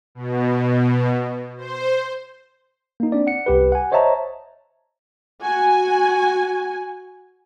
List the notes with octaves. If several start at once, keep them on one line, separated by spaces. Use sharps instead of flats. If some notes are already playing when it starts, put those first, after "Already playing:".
B2
C5
A#3 D#4
C4 D4 D5
F#5 C#7
C2 G4 B4
F#5 G#5
C5 C#5 D#5 E5 A5 A#5
F#4 G#5